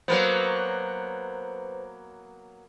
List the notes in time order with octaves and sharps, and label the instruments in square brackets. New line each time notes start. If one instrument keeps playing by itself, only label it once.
[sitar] F#3 A#3 B3 [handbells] B4 C5